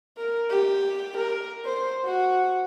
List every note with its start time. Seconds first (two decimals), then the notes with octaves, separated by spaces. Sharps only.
0.18 A#4
0.50 G4
1.17 A#4
1.65 C5
2.05 F#4